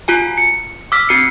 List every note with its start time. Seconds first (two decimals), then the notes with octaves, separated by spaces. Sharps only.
0.08 F4 F#4 G#5
0.38 C#7
0.92 D6 E6 F6 B6
1.09 C4 F#4 C7 C#7